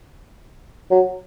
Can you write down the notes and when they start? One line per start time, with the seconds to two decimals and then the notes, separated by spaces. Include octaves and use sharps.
0.91 F#3